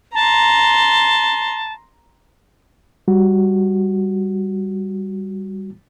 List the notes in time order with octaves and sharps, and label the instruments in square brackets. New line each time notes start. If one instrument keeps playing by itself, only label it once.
[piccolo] A5 [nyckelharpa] A#5 C6
[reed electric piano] G3 F#4